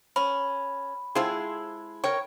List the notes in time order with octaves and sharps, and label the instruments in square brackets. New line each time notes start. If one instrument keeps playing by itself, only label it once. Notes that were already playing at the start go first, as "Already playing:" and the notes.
[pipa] C#4 [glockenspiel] B5
[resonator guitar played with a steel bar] G#3 E4 G#4 [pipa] C4 F4 A4
[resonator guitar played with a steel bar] A#4 G5 [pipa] C#5